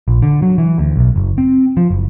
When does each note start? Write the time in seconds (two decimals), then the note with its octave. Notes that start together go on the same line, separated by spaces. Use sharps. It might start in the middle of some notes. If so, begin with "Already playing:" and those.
0.08 A#1
0.23 D3
0.42 F#3
0.58 E3
0.78 D2
0.96 B1
1.16 F#1
1.38 C4
1.77 F3
1.90 F#1